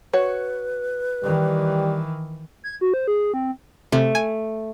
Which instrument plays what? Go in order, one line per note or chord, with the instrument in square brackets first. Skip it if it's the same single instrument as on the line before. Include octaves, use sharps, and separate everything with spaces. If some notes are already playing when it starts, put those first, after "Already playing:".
[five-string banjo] F#4 C#5 [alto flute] B4
[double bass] D#3 E3 [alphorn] G3
[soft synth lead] G#6
F#4
C5
G#4
C4
[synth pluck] C3 [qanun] A3
[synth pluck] G#5